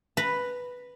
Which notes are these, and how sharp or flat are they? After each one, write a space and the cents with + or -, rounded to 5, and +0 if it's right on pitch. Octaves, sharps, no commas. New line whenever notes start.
B4 +0 A#5 -15